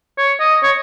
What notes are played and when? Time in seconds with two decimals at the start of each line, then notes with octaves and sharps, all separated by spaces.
0.18 C#5
0.40 D#5
0.63 C#5